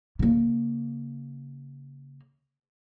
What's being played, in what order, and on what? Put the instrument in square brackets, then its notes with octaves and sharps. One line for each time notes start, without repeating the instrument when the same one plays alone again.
[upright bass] C#3 A#3